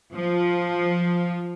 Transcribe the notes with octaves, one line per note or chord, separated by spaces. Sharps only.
F3